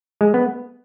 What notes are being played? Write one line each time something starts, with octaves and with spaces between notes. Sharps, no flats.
G#3
B3